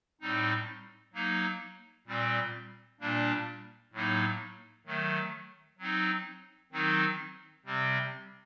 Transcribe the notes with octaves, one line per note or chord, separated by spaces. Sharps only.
A2 G3 C4 D#4
F#3 A#3 D#4
A#2 G3 C4
A#2 G3 A#3 D4
A2 F#3 A#3 D#4
D#3 F#3 A3
F#3 C4 D#4
D#3 F#3 C4 D#4
C3 G3 C4